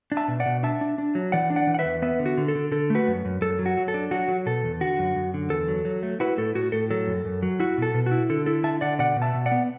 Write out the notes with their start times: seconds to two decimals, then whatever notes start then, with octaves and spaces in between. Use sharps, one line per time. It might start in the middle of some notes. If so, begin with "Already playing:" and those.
0.12 D4
0.17 E5 A5
0.28 B2
0.40 D5 F#5
0.46 B2
0.63 D4 E5 A5
0.81 D4
0.98 D4
1.15 F#3
1.32 E3 D5 F#5
1.50 D4
1.56 D5 F#5
1.67 E3
1.74 F#5
1.79 B4 E5
1.85 E2
2.02 B3 B4 E5
2.19 D3
2.26 F#4
2.37 D3
2.48 A4
2.55 D3
2.72 D3 A4
2.90 A3 F#4 B4
3.08 F#2
3.25 F#2
3.41 F#2 A4
3.59 F#3
3.66 F#4
3.77 F#3
3.88 A4
3.94 D4
4.11 F#3 F#4
4.28 F#3
4.46 B2 A4
4.64 E2
4.81 D3 F#4
4.99 F#2
5.16 F#2
5.34 D3
5.50 E2 A4
5.68 F#3
5.85 F#3
6.03 A3
6.20 E4 F#4 B4
6.38 A2 A4
6.55 A2 F#4
6.72 A2 A4
6.91 F#3 A4
7.07 F#2
7.25 F#2
7.43 F#3
7.60 E4 F#4
7.78 B2 A4
7.94 B2
8.06 F#4
8.11 E4
8.30 D3 A4
8.46 E4 A4
8.63 D3 E5 A5
8.81 D3 D5 F#5
8.99 B2 D5 F#5
9.16 B2
9.22 E5 A5
9.34 B2
9.46 D5 F#5
9.52 B3